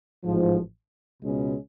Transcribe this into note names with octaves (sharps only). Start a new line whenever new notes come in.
A1 G#2 F3
C#2 B2 G#3 C#4